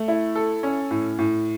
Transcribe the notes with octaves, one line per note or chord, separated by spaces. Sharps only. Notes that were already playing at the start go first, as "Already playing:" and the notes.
Already playing: A3
E4
A4
C#4
A2
A2